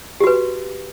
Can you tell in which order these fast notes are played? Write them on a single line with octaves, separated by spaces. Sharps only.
G4 F#4 B4